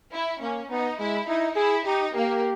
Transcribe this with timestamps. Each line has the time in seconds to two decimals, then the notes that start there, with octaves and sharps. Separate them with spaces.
0.13 E4
0.41 A#3 C#4
0.71 B3 D#4
0.99 G#3 E4
1.28 D#4 E4
1.56 E4 G#4
1.85 D#4 G4
2.14 A#3 G4